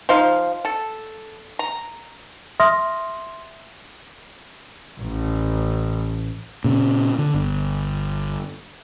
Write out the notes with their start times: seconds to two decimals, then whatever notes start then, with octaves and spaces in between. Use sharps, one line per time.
0.09 F3 D#4 C5 F5
0.65 A4
1.59 A#5
2.60 E5 C6 D#6 F6 A#6
5.00 A1
6.64 A#2 C#3
7.19 D3
7.34 G1